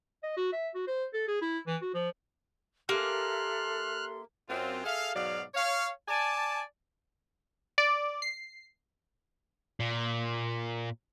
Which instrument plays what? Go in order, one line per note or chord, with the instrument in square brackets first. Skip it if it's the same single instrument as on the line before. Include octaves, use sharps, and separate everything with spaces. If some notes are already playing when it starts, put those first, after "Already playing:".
[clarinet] D#5
F#4
E5
F#4
C5
A4
G#4
E4
E3
F#4
F3
[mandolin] A#3 [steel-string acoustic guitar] C#4 G4 [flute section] A4 E5 C6 [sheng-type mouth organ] F6 F#6
[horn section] F#2 C4 F4
G#4 A4 E5 F5
G#2 B2 F#3 D5 F5
C#5 F5
D5 G#5 A5
[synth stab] D5
C7
[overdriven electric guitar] A#2